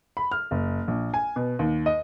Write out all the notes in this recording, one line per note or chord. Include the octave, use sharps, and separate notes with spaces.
B5
F6
F#1
A#1
G#5
B2
D#2
D#5